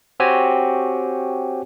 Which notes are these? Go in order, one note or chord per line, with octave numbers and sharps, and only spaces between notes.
C4 F#4 G4 C#5 G#5